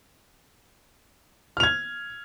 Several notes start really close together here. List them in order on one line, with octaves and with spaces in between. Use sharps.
F6 F7 G#6